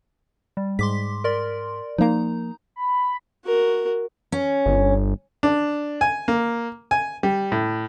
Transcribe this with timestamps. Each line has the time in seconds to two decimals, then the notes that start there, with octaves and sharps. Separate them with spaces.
0.57 G3
0.79 G#2 C6 D6 B6
1.24 A#4 D5 C6
1.98 F3 A#3 D#4 A#5
2.76 B5
3.45 F#4 A#4
4.32 C#4
4.66 G1
5.43 D4
6.01 G#5
6.28 A#3
6.91 G#5
7.23 G3
7.52 A2